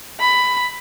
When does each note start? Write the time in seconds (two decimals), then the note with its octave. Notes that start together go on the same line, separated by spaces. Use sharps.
0.20 B5